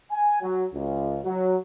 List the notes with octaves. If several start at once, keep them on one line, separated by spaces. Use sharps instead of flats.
G#5
F#3
C#2
F#3